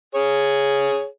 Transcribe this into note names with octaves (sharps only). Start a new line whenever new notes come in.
G#4 C#5